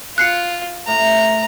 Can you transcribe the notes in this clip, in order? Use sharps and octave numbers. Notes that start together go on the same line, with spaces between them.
F4 F#6 C7 C#7
A2 A#5